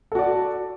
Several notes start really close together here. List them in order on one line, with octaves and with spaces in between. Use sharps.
A4 F#4 D5